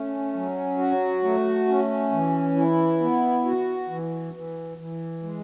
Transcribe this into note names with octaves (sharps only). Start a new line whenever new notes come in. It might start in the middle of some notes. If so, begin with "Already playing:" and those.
Already playing: A3 C#4
F#3
F#4
A3
C#4
E3
E4
B3
F#4
E3
E3
E3
G#3